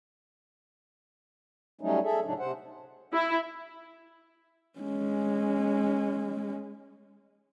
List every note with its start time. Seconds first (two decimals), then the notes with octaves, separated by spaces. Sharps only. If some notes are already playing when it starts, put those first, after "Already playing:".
1.81 F#3 G3 A3 C#4 D#4
2.03 G#4 A4 E5
2.24 A2 C#3 F#3 D4 D#4
2.39 C3 C5 F#5
3.13 E4
4.79 G#3 C#4